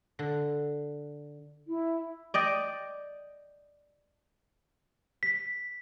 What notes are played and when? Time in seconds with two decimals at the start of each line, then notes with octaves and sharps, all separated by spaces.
0.19 D3
1.68 E4
2.34 D5 D#5 G5
5.23 B6